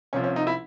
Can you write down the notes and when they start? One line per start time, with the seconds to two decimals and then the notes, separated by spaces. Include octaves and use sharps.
0.13 C2 C3 F3 C#4
0.24 C#4
0.36 D#4
0.47 E4